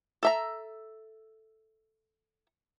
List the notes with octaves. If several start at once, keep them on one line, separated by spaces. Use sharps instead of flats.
A4 E5 A#5